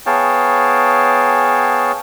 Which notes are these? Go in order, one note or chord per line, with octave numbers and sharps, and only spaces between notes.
B3 G#4 C#5 F5 G5 A5